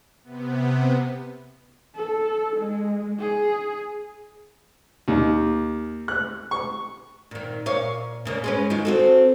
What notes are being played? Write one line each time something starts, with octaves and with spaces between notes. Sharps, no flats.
C3 B3
A4
G#3
G#4
D#2
F#6
C#6
A#2 D#3
A#2 C#5 F5
A#2 C#3 A#3
G#3 C#4 B4
D#3 G#3 F4
C4 F#4 A4